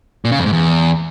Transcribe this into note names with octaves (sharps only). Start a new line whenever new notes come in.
A#2
C#3
F2
G#2
E2